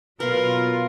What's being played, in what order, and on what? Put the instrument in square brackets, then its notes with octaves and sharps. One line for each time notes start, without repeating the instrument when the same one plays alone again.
[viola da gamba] B2 [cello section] F#3 F4 [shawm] A#4 [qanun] B4 F5